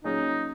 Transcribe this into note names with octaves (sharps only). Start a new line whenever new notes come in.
A#2 F#3 C#4 D#4 G#4